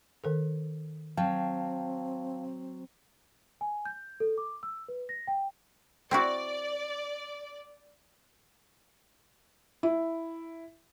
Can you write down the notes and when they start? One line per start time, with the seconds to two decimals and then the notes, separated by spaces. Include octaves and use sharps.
0.24 D#3 A4 A#4
1.17 F#3 C4 F5 G5 A5
3.61 G#5
3.85 G6
4.20 A4
4.38 D6
4.63 E6
4.88 B4
5.09 A#6
5.27 G5
6.11 C4 E4 F#4 D5
9.83 E4